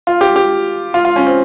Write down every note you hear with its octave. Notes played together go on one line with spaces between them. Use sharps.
F4
G4
G4
F4
F4
C#4
C4